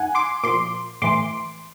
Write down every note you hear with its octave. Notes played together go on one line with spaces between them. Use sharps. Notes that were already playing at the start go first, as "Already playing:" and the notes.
Already playing: F#2 D#3 F#5 G#5
C6 D6
A#2 F3 C6 D6
A2 E3 C6 D6